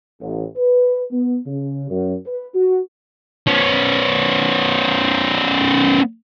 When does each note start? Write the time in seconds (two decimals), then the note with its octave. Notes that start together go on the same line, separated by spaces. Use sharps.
0.21 A1
0.56 B4
1.12 B3
1.46 C#3
1.89 F#2
2.26 B4
2.55 F#4
3.47 B3 C#4